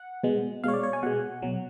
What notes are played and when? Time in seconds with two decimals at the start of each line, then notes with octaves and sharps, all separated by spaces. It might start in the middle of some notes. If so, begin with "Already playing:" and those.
Already playing: F#5
0.23 B2 G#3
0.64 B2 G#3 C#5 F5
0.74 D5
0.83 C#5
0.93 G#5
1.03 B2 G#3 F#5
1.42 B2 F#3